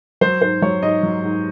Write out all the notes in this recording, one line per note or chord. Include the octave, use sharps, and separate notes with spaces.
F#3 C5
G#2 C5
F#3 C#5
G#2 D#5
F#3
G#2